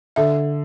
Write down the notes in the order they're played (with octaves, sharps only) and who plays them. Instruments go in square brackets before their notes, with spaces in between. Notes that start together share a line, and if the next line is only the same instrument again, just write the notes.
[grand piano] D3 [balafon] E5